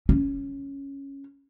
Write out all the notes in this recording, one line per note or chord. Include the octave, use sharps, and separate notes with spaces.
C#4